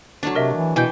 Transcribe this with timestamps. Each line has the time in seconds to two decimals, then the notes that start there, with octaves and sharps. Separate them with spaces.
0.23 F#3 A3 D4
0.35 C3 A#4 D#5 E5
0.55 E3
0.76 B2 E3 G5 G#5 G6